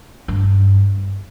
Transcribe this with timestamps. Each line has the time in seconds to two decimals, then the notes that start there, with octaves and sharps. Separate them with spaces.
0.28 G2